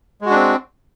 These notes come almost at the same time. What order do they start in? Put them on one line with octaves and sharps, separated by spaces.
G#3 F#4 D4 C4